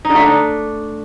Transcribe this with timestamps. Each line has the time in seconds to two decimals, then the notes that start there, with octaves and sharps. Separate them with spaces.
0.05 D#4
0.10 D3
0.15 A3
0.20 D#4
0.26 D4